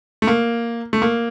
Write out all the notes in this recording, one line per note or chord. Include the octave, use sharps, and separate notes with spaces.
A3
A#3
A3
A#3